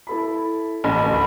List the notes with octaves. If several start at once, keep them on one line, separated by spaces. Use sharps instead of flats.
E4 A4 B5
A1 B5
D2